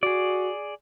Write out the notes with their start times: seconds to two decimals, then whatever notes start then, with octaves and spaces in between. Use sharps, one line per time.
0.03 F#4 G#4 D5